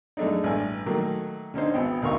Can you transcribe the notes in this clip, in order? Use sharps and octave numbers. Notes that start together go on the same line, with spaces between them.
F#2 G#3 A3 D4 D#4
A1 G2 D5 G#5
D#3 F#3 A3 A#3
D3 C#4 D#4 C5
G#1 B3 G5
D2 D#4 A#4 F5 C#6